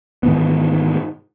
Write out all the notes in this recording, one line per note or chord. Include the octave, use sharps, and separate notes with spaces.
G#2 D#3 E3 B3